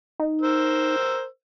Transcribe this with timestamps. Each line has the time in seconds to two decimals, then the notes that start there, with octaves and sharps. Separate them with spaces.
0.20 D#4
0.42 A#4 C5 E6